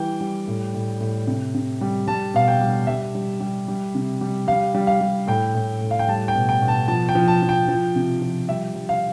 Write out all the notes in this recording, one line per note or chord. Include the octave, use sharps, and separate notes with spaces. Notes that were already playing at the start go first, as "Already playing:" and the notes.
Already playing: E3 G3 G5
G3
A2
A2
A2
C3
C3
G3
G3 A5
B2 F5
G5
G3
G3 E5
G3
G3
G3
C3
G3
G3 F5
G3
F5
G3
A2 G5
A2
A2
F5
G5
G3 A5
G5
B2
G5
B2
A5
F3 A5
G5
F3
A5
F3
G5
F3
C3
F3
G3 E5
G3
F5